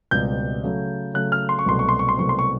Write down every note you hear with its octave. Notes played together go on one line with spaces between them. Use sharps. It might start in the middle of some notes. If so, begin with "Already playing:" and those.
C#2 B2 G3 C4 G6
C#3 F#3 A3
C#3 F#3 A3 F#6
F6
C6
C#6
C2 B2 F#3 A3 C4 C6
C#6
C6
C#6
C6
C2 B2 F#3 A3 C4 C#6
C6
C#6